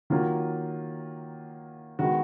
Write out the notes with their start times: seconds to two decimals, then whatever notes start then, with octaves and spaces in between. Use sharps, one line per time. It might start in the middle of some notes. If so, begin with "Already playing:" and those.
0.10 D#3 F#3 A#3 F4
1.99 D#3 G#3 B3 F#4